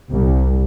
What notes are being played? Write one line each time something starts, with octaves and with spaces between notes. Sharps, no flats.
C2